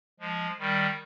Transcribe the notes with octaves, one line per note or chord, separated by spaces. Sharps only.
F3 G#3
D#3 G3